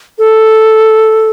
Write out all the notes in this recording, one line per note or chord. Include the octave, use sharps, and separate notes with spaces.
A4